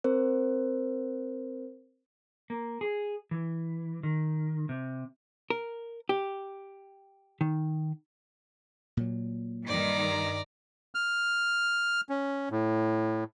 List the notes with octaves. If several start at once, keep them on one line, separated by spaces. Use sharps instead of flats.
C4 A#4 C5
A#3
G#4
E3
D#3
C3
A#4
G4
D#3
A#2 F#3
G2 D#3 D5 A#5
F6
C#4
A2